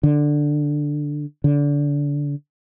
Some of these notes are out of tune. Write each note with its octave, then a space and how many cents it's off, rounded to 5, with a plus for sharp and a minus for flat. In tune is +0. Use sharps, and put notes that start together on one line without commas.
D3 +5
D3 -25